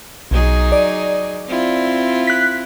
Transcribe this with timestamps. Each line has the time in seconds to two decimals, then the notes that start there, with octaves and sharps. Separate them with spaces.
0.31 B1 F#3 D#4 G#4
0.72 D5
1.48 C4 E4 F4
2.27 F#6 B6